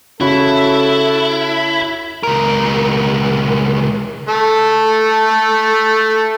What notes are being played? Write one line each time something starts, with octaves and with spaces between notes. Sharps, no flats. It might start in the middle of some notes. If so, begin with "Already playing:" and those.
C#3 E4 F#4 A4 B5
C#2 A#4
A3 A4